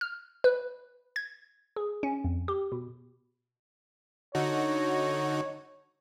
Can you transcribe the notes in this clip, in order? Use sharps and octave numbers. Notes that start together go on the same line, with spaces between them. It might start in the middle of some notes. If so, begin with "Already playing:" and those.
F6
B4
G#6
G#4
C#4
F2
G4
B2
D3 D#4 F#4 C#5